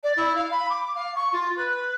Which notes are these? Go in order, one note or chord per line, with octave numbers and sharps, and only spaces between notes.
D5
E4
F5
B5
D6
F5
C#6
F4
B4